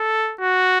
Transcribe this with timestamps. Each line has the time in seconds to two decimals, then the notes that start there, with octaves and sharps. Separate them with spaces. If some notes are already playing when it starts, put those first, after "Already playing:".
Already playing: A4
0.40 F#4